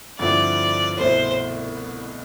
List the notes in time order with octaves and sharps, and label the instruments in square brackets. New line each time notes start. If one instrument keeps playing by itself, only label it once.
[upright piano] G2 D3 F3 C4 E4 [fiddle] D5
[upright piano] C2 B2 A3 E4 [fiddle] C5